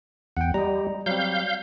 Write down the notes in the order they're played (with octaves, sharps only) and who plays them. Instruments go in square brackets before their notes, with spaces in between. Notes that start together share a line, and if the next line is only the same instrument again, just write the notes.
[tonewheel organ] E2 [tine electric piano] F#5 G5
[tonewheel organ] G3 [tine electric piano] D#5 A#5
[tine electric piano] F#3 G3 C4 [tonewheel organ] F5 G6